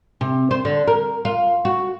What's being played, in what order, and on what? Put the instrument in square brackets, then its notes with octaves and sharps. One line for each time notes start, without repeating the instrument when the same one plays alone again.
[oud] C3
C5
D3
A#4
F4
F#4